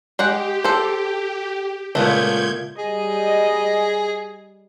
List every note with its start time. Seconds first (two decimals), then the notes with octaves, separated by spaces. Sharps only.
0.19 G#3 G4 F#5 G5
0.64 A4 C5
1.95 C#2 A#2 A3 B3 G6 G#6
2.78 G3 G#4 D#5